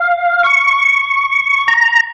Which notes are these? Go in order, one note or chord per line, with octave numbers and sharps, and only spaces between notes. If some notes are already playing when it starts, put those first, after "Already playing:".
Already playing: F5
C#6
A#5